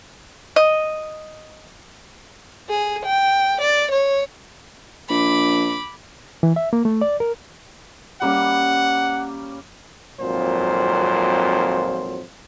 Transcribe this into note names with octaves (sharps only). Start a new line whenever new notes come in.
D#5
G#4
G5
D5
C#5
A#1 B5 D6
E3
E5
A#3
A3
D5
A#4
G3 A#3 C#4 F#5
G#1 F2 A#2 F#3 C5